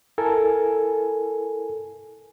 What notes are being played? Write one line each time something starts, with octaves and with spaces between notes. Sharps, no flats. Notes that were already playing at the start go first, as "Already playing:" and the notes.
E4 A4 A#4 G#5